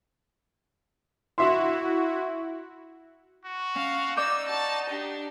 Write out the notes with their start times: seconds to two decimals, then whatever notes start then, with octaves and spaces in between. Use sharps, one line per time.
1.38 E4 F#4 E5 C6
3.44 F#4
3.75 C#4 F5
4.17 D#4 D5 D6 E6 G6
4.47 F#4 A5
4.89 D4 G4